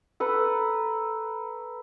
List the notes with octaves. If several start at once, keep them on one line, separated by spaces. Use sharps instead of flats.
A4 B4 A#5